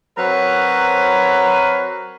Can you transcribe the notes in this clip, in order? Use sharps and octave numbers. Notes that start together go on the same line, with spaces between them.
F#3 C4 A#4 B4 C#5